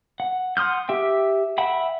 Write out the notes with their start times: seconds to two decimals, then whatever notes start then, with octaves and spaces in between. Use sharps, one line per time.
0.20 F#5
0.57 F#5 C6 D#6 F6 G6
0.89 G4 E5 G5
1.58 E5 F#5 G5 B5